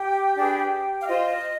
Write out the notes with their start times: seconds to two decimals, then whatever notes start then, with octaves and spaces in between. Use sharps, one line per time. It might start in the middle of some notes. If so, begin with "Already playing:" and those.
Already playing: G4 G5
0.35 D4 G#4 B4
1.01 F5
1.06 F4 C5 D#5
1.30 D#5